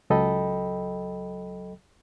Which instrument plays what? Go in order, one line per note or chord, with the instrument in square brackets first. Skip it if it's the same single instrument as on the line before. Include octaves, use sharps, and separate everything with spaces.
[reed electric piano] C#2 F#3 A4 D#5 G5 B5